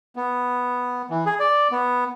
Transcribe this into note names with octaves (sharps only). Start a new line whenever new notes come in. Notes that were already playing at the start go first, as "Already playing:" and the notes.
B3
E3
G#4
D5
B3